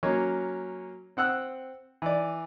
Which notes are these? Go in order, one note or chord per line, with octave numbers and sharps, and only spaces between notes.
F#3 A#3 C#4 C#5
C4 F#5 E6 F#6
E3 D5